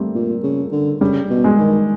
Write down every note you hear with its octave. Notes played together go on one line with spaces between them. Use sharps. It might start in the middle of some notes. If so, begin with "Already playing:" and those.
Already playing: G3 A3 A#3 C4
A#2
C#3
D3
C#3 G3
B2
G#3
D#3